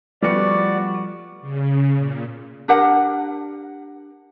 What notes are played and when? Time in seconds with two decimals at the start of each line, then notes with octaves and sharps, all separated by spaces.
0.22 F3 G3 A3 B3 F#4 D5 C#7
1.41 C#3
1.97 A#2
2.68 D4 G4 A#4 F#5